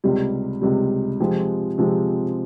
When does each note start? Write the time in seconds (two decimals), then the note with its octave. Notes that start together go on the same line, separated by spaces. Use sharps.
0.04 C#2 C3 G3
0.61 C#2 C3 G3
1.20 C3 F3 G#3 C4 G4
1.78 C3 F3 G#3 C4 G4